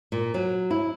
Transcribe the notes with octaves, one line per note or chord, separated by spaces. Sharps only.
A#2
F#3
E4